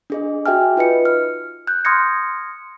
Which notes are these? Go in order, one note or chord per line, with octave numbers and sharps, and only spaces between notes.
D4 G#4 D#5
F#4 G#4 E5 G5 G#5 F6
D#4 F4 B4 D#5 C#7
F6
F#6 G6
C6 D#6 F6 G#6 A#6 C#7